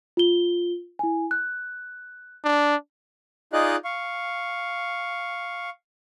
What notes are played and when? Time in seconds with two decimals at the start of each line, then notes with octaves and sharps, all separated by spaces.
0.17 F4 G7
0.99 E4 G#5
1.31 F#6
2.44 D4
3.53 D#4 F4 G#4 D5 D#5 F#6
3.85 F5 C#6